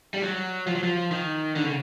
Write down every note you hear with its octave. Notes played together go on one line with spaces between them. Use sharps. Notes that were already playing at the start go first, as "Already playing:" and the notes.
G3
F#3
F3
F#3
F3
D#3
D3
C#3